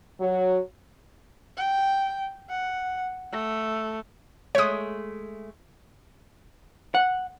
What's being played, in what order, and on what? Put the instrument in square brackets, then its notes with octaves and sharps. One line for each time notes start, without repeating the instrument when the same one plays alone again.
[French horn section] F#3
[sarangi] G5
F#5
A3
[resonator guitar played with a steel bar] G#3 A3 [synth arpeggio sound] C#5 D#6
[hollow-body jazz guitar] F#5